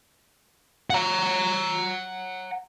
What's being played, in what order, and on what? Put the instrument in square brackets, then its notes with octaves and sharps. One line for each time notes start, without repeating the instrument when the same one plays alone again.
[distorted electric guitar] F#5 A#5